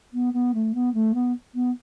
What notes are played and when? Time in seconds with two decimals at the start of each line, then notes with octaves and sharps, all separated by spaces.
0.13 B3
0.33 B3
0.54 A3
0.74 B3
0.94 A3
1.14 B3
1.54 B3